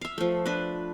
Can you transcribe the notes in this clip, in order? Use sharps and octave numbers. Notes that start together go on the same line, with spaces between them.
E5 F5
F3 A3
D4 B4